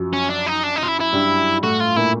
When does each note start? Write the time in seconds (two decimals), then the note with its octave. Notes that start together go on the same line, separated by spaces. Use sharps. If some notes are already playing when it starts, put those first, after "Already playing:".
Already playing: F#2 F3 F#3
0.13 C#4
0.30 D4
0.46 D#4
0.63 D4
0.76 D#4
0.83 F4
0.88 E4
1.01 E4
1.13 G2 G3
1.63 A2 A3 F#4
1.80 F4
1.96 A#2 A#3 E4